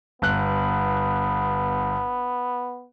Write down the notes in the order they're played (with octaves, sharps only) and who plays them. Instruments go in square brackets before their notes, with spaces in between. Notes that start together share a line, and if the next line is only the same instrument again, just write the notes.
[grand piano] G1 F#6 [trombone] B3